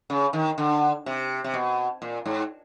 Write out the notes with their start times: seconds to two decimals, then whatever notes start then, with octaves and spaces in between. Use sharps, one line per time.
0.10 C#3
0.33 D#3
0.58 D3
1.06 C3
1.44 C3
1.54 B2
2.02 A#2
2.26 G#2